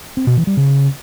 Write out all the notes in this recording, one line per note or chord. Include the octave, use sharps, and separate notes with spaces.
C4
B2
E3
G3
C#3